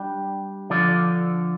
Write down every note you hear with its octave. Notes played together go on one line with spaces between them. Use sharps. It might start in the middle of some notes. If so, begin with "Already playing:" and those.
Already playing: G3 D4 G4
D3 F3 D4 A4 D5